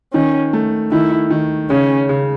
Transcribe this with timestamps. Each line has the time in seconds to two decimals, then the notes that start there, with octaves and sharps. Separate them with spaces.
0.14 D#3 C#4
0.53 A3
0.91 D#3 E4
1.31 D#3
1.70 C#3 C#4
2.09 C#3